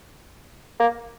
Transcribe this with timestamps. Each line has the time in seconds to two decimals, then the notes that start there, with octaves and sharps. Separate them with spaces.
0.80 A#3